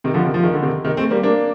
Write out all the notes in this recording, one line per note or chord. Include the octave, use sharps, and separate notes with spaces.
C3 D#3
D3 F3
C3 D#3
F3
D#3
D3
C3 D#3
C3 D#3
A3 C4
G3 A#3
A#3 D4